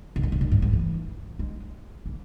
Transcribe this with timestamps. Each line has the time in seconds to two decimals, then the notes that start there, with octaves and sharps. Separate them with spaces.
0.16 B2
0.23 A#2
0.32 B2
0.41 A#2
0.52 G#2
0.62 G#2
0.73 E3
1.39 G#3
2.06 A#3